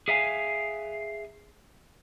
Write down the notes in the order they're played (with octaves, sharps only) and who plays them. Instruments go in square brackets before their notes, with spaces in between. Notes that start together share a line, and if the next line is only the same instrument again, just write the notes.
[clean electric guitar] G#4 E5 F5 G#5